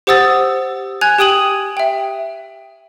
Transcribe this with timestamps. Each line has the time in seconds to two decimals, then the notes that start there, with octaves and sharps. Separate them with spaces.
0.07 G4 C5 F#5 D#6 E6 A6
1.01 G#5 F#6 G#6 F7
1.18 G4 G5 D#6 D#7 F#7
1.77 E5 G5